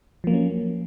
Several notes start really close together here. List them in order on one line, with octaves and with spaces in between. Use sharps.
F3 A#3 F#3 C#4